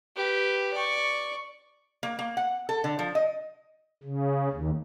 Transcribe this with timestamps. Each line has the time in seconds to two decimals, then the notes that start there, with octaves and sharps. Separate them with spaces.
0.16 G4 B4
0.73 D5 C#6
2.03 A#3
2.19 A#3
2.37 F#5
2.69 A4
2.84 D3
2.99 F3
3.15 D#5
4.04 C#3
4.52 D#2